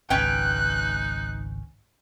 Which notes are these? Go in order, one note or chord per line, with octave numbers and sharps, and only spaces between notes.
G#1 C#2 C#4 D#4 B4 G5 F#6